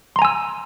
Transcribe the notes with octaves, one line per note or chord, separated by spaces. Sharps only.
G#5 A#5 C6 E6